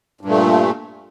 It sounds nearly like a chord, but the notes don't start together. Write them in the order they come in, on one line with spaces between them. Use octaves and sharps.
G2 A#2 A3